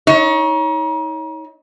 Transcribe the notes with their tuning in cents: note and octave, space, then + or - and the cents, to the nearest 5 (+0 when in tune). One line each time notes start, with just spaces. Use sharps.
D#4 +35 C#5 +0